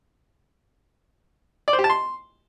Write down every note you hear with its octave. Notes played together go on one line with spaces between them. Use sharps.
D5
C5
G4
A5
C6